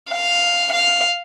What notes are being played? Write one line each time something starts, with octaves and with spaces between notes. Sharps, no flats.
F5
F5